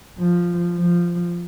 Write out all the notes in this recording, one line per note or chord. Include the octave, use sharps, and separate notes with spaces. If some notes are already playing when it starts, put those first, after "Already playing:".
F3
F3